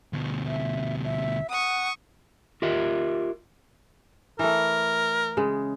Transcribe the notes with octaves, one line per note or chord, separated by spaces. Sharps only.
D2 B2
E5
E5
F#5 C#6 D#6
F4 G4 A#4 E5
E3 A3 A#4
C#3 G#3